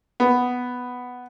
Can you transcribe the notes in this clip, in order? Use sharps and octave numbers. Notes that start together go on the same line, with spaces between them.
B3